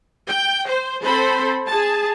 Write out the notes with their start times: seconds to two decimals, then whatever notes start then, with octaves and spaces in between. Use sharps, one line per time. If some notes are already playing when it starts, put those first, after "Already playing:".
0.28 G5
0.68 C5
1.04 C4 A4 C5 B5
1.68 G#4 A5